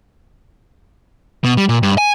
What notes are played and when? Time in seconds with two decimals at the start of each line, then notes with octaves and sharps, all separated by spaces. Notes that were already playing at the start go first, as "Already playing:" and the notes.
1.44 B2
1.57 G3
1.69 A#2
1.83 G2
1.98 G#5